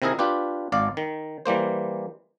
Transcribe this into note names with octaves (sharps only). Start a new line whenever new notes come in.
C3 D#3 E4 G#4 A#4
D4 F4 G4 B4
G#1 D5 F5
D#3
E3 G3 A#3 C5